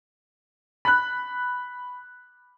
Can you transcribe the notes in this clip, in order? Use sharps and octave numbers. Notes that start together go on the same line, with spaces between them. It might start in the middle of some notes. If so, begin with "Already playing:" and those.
B5 F#6